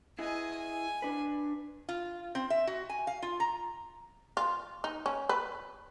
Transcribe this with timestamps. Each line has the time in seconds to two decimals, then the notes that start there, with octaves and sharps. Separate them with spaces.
0.19 E4 G#4 D#5 G#5
0.56 G#5
1.02 D4 B4
1.89 F4
2.35 C4
2.50 E5
2.67 F#4
2.89 G#5
3.07 F5
3.22 F4
3.40 A#5
4.37 F4
4.84 D#4
5.06 C#4
5.29 B4